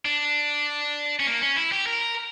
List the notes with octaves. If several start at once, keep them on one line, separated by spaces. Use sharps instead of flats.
D4
C#4
A#3
C#4
E4
G4
A#4